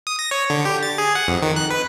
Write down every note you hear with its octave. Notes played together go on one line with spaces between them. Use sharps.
D#6
A#6
C#5
D3
G4
A6
G#4
F#5
F2
D#3
F#6
B4